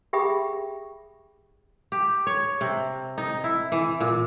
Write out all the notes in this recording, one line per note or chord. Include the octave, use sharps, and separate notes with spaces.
G4 G#4 E5 G5 B5 D#6
G4
C#5
C3
D#4
E4
E3
A#2